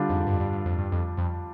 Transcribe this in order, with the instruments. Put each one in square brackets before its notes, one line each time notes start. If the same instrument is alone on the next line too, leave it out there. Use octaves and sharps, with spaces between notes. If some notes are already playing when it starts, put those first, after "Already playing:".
Already playing: [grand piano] D3 G3 D4 F4
[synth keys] F2 G#2
G2
F2
G2
G2
F2
G2
F2
F2